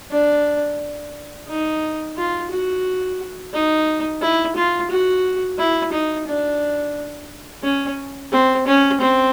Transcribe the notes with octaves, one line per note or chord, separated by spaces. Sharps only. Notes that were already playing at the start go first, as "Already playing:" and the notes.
D4
D#4
F4
F#4
D#4
E4
F4
F#4
E4
D#4
D4
C#4
C4
C#4
C4